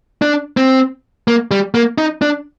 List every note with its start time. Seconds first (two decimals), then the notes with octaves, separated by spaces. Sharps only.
0.22 D4
0.57 C4
1.28 A#3
1.51 G3
1.74 A#3
1.98 D#4
2.22 D4